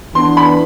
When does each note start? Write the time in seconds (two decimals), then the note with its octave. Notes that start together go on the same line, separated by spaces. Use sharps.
0.15 E3 B3 D4 C6
0.37 B5